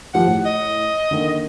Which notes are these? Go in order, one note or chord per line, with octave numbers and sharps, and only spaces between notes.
D#3 F3 G4 F#5
A2
D#5
D3 D#3 A#3